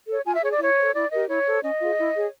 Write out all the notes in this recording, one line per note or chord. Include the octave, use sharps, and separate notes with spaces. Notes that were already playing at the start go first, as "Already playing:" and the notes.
A4 C#5
F4 G#5
E5
G#4 C#5
D5
E4 C#5
A4 C5
E4 D5
G4 A#4 D#5
E4 C#5
A4 C5
C#4 D#5
F4 G#4
E4
G#4 C#5